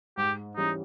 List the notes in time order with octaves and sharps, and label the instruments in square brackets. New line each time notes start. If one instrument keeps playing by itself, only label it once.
[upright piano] G#2 [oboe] G4
[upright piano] E3 G3 C#4 G4 [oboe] D#4